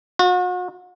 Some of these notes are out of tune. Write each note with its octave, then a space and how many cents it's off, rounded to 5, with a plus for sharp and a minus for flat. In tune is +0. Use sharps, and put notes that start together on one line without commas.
F#4 -40